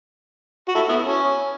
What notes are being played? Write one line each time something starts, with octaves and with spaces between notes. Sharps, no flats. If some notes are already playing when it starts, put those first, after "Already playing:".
F#4
E4 A4
B3 E4
C#4